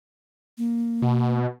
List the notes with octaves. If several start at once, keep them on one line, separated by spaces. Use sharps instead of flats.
A#3
B2